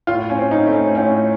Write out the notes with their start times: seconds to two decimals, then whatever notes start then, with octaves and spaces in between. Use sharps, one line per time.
0.07 A2 F4
0.30 C#4
0.37 C4
0.51 D#4
0.66 A3
0.73 C#4
0.95 A2 C#4